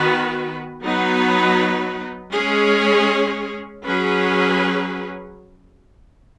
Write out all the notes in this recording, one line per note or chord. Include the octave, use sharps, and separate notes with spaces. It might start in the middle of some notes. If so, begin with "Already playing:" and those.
Already playing: D#3 B3 F#4 B4
F#3 B3 D#4 B4
G#3 C#4 G#4 C#5
F#3 C#4 G#4 B4